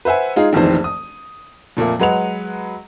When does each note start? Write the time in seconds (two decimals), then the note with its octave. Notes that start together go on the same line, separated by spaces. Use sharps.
0.05 B4 C5 E5 F#5 G#5
0.36 G#3 D#4 F4 G#4
0.53 F1 A#1 F2 D#3 E3 C5
0.84 D#6
1.77 F2 A#2 A3 A#3
1.99 F#3 G#3 B4 F#5 F7